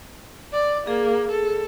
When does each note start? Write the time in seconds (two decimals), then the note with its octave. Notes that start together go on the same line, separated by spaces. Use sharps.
0.53 D5
0.87 A#3 G#4
1.31 A4